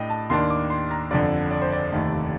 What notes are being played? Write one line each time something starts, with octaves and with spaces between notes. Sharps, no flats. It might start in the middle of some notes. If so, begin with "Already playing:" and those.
Already playing: A2 A3 D4 D#5 G5
A5
D#2 D#3 A#3 D4 C6
D6
C6
A#5
G1 F2 D3 D5
D5
C5
D5
F1 D#2 D#3 A3